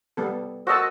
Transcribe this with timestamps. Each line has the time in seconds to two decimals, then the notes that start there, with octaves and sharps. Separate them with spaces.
0.17 G3 B3 A4
0.67 F#4 A#4 C5 D#5 F#5 A5 E6